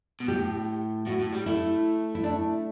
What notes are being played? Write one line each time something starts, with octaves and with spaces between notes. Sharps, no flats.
B2
A2 G4
A2 F#4
A2
G3
A3 E4
E4
D4